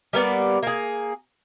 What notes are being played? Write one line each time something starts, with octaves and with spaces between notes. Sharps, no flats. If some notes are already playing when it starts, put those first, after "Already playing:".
G3 A#3 B3 D5
A#3 G#4